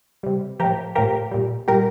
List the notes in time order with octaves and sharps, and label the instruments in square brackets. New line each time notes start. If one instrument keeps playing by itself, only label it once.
[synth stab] C3 G3
F3 G4 A#4
A2
A2 F3 G4 A#4
A#2 G3
A#2 G3 G4 A#4